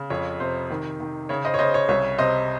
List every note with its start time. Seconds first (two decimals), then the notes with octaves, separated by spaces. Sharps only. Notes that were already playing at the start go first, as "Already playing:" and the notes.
Already playing: C#3
0.10 F2 C#5
0.40 C3 C5
0.70 D#3
1.00 D#3
1.29 C#3 C#5
1.45 C5 D#5
1.54 C#5
1.59 C#3 C5 D#5
1.74 C#5
1.89 C2 C#5
2.18 C3 C5 D#5